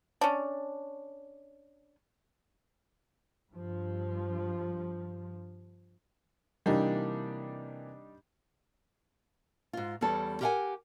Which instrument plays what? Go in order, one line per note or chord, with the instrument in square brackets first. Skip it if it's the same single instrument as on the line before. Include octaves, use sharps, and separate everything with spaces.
[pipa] C#4 D4
[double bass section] G2 F3
[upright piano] C3 E3 A#3 [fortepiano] G3 D4 D#4
[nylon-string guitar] G#2 F4
E2 G3 C#4 A4
G4 A#4 B4 F5 F#5 G#5